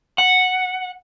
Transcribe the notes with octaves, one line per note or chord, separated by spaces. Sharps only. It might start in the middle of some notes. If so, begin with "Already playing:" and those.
F#5